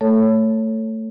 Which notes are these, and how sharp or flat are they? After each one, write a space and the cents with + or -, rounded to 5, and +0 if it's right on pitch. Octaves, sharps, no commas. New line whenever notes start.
A3 +15 A4 +0 C#5 +0